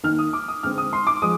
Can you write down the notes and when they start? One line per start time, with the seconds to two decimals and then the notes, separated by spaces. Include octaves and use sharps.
0.03 D#3 A#3 F6
0.18 D#6
0.33 D6
0.48 D#6
0.63 D3 G#3 C4 F6
0.78 D#6
0.93 C6
1.07 D6
1.22 F3 G#3 D#6